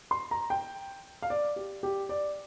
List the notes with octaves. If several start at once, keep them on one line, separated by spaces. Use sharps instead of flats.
C6
A#5
G5
F5
D5
G4
G4
D5